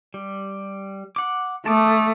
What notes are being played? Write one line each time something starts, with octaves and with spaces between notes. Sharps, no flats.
G3
F#5 D6
A3 A5 D6 D#6